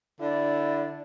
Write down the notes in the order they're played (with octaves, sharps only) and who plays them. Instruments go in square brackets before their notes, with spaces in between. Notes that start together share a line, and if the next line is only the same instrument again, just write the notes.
[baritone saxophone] D3 [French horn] E4 [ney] D5